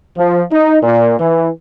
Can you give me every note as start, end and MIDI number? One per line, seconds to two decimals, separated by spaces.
0.17 0.43 53
0.52 0.79 63
0.83 1.18 46
1.20 1.49 52